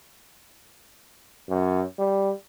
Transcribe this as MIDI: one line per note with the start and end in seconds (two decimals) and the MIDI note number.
1.49 1.83 42
1.99 2.32 55